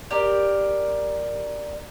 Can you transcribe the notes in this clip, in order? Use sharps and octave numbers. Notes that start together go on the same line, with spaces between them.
G4 A#4 D5